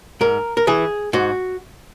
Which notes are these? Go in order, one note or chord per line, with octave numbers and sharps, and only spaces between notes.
G#2 A#4
A#4
E3 G#4
G#2 F#4